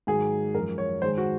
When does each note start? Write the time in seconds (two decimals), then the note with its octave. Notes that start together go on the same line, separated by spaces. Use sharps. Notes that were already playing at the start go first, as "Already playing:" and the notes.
0.07 G#2 D#3 F#3 G#4
0.54 F#2 A#4
0.57 F3 G#3
0.78 C#5
1.02 G#2 D#3 G#3 C5
1.18 F#4